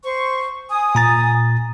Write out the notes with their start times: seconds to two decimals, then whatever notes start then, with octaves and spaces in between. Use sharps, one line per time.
0.03 C5 C#6
0.69 G#5 D#6
0.95 A#2 A#5 A6